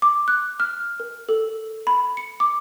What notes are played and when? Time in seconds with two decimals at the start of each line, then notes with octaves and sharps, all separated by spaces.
0.02 D6
0.28 F#6
0.60 F6
1.00 A#4
1.29 A4
1.87 B5
2.17 C#7
2.40 D6